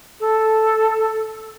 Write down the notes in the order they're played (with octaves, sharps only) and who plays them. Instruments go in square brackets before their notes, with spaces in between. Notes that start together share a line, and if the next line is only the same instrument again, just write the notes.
[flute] A4